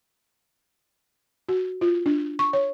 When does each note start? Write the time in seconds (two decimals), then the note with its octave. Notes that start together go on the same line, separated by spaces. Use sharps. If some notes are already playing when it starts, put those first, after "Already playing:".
1.49 F#4
1.81 F4
2.06 D4
2.39 C#6
2.53 C#5